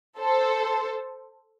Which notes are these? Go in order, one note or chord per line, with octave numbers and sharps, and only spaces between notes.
A4 C5